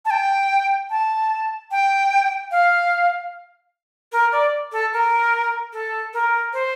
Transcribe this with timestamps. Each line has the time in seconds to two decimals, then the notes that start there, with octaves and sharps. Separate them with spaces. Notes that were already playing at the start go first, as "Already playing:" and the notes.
0.05 A5
0.10 G5
0.90 A5
1.71 G5
2.51 F5
4.12 A#4
4.32 D5
4.72 A4
4.93 A#4
5.73 A4
6.13 A#4
6.53 C5